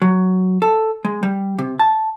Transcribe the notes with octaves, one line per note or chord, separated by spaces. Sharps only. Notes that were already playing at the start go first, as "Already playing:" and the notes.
F#3
A4
G#3
G3
C3
A5